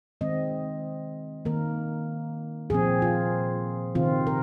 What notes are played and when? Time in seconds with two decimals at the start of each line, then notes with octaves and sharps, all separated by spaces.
0.21 D#3 G#3 C4 D#5
1.45 D#3 A#3 A#4
2.70 A#2 F3 C4 G#4
3.02 F4
3.95 C3 D#3 C4 F4
4.27 A#4